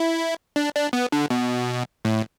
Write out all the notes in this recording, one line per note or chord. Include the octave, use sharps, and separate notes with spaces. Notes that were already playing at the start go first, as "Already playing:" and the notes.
Already playing: E4
D4
D4
B3
D3
B2
A2